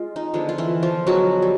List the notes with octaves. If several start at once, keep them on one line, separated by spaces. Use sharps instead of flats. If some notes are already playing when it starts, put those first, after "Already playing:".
Already playing: G#3 F4
D#4
D3 F3 G#3 B3
F4
E3 E4
F3 F4
D3 F3 F#3 G#3 B3 F#4
G3